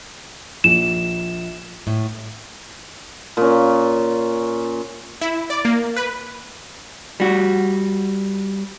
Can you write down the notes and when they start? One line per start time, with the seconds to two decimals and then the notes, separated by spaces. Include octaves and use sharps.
0.64 A#1 E7
1.87 A2
3.37 A#2 C#4
5.21 E4
5.50 D5
5.65 A#3
5.96 B4
7.20 G3 F#4